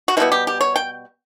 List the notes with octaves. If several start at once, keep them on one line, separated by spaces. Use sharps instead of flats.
F#4
B2 G3 B3 E4
G4
G4
C#5
G5